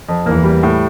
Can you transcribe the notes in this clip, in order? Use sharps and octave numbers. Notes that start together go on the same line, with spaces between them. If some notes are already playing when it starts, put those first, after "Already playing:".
F2
E2 E3 A#3
G3
A2